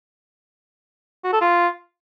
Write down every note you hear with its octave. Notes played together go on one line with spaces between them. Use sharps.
F#4
A4
F4